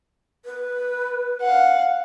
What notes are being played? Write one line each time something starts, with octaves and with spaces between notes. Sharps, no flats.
B4
F5 F#5